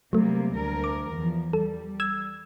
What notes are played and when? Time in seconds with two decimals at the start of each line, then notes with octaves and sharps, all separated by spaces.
0.13 C3 F#3 G3 A3 A#3
0.55 D2 A#4
0.84 D6
1.14 E2 F3
1.53 G3 A4
2.00 E6 G#6